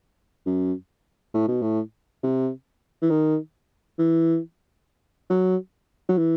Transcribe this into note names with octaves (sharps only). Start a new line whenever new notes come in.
F#2
A2
B2
A2
C3
E3
D#3
E3
F#3
F#3
E3